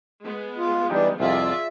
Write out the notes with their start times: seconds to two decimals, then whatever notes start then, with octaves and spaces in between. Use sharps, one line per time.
0.23 G#3 B3
0.57 F4
0.90 E3 G3 D4 D#4 G4
1.20 C2 F2 F4 G#4 D5 E5